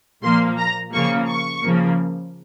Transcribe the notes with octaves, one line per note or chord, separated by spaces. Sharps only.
A#2 F3 A#3 C6
A#5
C#3 F3 A#3 C#6
C#6
C#3 F3 A#3